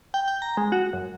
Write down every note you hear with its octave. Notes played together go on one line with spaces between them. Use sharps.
G5
G5
A#5
G#3
F#4
F#2